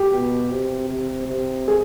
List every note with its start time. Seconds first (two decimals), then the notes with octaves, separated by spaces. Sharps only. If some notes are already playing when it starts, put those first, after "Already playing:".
Already playing: G4
0.12 B2
0.50 C3
0.89 C3
1.28 C3
1.68 G#4